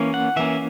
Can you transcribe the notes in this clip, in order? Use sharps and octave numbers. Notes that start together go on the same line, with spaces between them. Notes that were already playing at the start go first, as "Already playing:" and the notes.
Already playing: E3 A#3 C#4
F#5
E3 A#3 C#4 E5